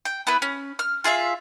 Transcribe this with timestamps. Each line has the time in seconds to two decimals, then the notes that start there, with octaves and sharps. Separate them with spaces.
0.05 G5
0.27 B3 E4 B4
0.42 C#4
0.79 F6
1.04 F4 G#4 E5 F5